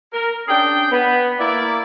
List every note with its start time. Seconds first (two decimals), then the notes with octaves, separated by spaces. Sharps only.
0.14 A#4
0.48 C#4 D4 G#4 G5
0.91 B3
1.40 A#3 E4 D5